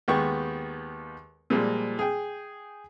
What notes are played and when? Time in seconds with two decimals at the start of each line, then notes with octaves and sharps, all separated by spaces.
0.08 D#2 G#3 B3 G5 C#6
1.50 A#2 F3 G3 G#3
1.99 G#4 G5